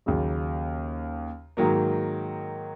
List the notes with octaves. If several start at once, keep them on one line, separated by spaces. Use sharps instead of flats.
D#2 C#3 F#3
G#2 D#3 F#3 A#3